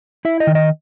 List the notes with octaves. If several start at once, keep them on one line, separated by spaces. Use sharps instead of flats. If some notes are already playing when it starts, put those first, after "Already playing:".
E4 E5
D#5
D#3
D#5